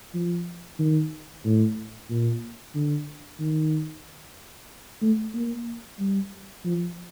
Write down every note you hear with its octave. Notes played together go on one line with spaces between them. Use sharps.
F3
D#3
A2
A#2
D3
D#3
A3
A#3
G3
F3